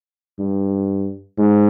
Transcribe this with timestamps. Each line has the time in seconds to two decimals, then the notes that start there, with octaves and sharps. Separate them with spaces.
0.39 G2
1.38 G#2